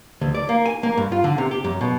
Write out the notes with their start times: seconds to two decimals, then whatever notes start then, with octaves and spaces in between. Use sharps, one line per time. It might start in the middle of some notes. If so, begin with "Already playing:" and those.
0.21 D2
0.35 D5
0.49 A#3
0.66 G#5
0.83 A#3
0.98 G2
1.12 F4
1.24 D3
1.38 C3
1.51 G4
1.64 F#2
1.81 B2